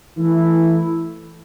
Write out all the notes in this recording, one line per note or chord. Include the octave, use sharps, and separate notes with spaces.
E3 A3 E4